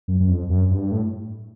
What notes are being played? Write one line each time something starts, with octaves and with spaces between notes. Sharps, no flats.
F#2
F#2
F2
F#2
G2
A2